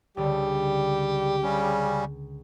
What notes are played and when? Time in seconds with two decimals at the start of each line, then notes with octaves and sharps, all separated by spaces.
0.17 C#2 D3 G3 G4
1.43 C#3 G3 C#4